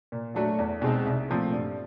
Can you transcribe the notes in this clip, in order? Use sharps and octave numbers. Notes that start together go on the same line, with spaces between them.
A#2
F#3 A3 D4 F#4
E2
B2 G#3 C4 D#4
C2
A#2 F3 A3 C4
G2